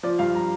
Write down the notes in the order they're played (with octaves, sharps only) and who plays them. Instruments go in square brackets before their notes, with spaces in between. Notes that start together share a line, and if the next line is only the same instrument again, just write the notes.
[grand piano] F3 D5
G2 F5
A#5